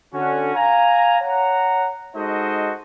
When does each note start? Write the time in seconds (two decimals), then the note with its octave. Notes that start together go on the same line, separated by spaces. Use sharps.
0.14 D3 C#4 F#4
0.56 F5 G#5 A#5
1.21 C#5 F#5 A#5
2.16 G#3 D#4 F#4 A4 C5 D#5